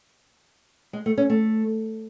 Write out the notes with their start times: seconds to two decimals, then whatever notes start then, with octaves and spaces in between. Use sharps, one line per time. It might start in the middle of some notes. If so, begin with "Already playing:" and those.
0.93 G#3
1.06 A3
1.17 C#4
1.30 A3